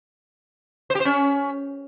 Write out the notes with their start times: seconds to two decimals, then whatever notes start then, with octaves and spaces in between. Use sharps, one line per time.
0.90 C5
0.95 G4
1.00 C5
1.05 C#4